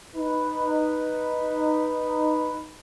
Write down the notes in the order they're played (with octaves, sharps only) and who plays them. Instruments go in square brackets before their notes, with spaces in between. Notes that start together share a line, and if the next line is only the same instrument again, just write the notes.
[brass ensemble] D#4 B4